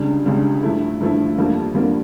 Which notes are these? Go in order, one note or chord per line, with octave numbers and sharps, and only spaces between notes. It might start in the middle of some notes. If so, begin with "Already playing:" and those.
Already playing: C#2 C#3 G3 D4
C#2 C#3 G3 D4
G2 F3 A3 E4
G2 F3 A3 E4
F2 D3 G3 A#3
F2 D3 G3 A#3